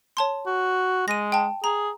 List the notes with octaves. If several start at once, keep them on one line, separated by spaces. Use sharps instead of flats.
C#5 A5 C6
F#4
G#3 A#6 D#7
G5 A5
G#4 A#5